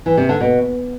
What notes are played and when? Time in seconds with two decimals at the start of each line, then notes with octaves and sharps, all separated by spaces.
0.06 E3
0.17 C3
0.29 D3
0.40 B2